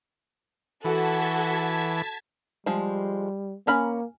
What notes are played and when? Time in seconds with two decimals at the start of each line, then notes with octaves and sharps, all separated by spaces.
0.84 E3 F#4 A4 A5 G#6 B6
2.66 F3 G3 G#3
3.67 A#3 C#4 G#5 A#5 B5 F6